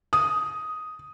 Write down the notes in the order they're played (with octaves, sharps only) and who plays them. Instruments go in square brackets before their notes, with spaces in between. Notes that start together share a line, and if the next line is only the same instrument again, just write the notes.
[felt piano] D#6